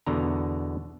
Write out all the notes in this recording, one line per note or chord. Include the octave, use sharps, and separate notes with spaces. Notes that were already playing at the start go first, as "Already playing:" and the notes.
E2 B2 D3 A#5